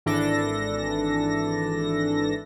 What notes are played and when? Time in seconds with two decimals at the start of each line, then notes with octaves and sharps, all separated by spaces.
0.06 G#1 E3 D4 A4 A#6